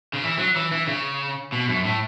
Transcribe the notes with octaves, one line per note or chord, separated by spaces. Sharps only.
C#3
E3
F#3
E3
E3
C#3
B2
F#2
A2